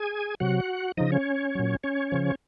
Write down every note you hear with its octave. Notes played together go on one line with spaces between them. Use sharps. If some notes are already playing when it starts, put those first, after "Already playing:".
Already playing: G#4 G#5
C3 F#3 F#4 F#5
C#3 F3 D#4 D#5
C#4 C#5
A#2 F#3
C#4 C#5
C#3 F3